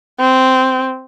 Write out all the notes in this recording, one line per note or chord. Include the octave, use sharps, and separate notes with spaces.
C4